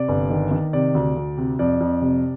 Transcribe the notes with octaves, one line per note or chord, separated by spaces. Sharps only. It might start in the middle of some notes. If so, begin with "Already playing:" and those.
Already playing: C3 D5
G1
D#3
D#3
C3 D5
D2
D2
C3
F2 D5
F2
C3